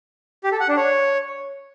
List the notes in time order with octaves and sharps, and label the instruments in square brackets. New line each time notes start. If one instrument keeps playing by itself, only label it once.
[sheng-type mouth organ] G4
A4
F#5
D4
C#5